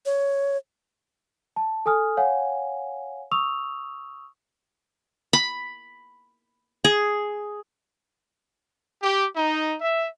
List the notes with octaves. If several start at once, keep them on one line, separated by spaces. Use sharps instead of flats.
C#5
A5
A4 G#5 D#6 F6
C#5 F5 F#5 G#5
C#6 D#6 E6 F7
B5
G#4
G4
D#4
E5